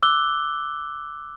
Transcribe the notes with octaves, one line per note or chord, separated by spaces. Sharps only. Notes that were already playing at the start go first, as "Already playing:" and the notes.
D6 E6 F#6 G7